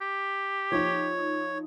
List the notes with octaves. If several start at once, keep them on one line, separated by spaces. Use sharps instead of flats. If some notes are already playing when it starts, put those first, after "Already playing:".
G4
F3 D#4 C#5